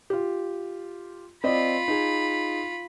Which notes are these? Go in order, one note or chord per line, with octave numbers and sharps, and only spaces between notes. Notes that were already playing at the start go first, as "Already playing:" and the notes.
F4 G4
C4 F4 D5 D#5 B5
D#4 G#4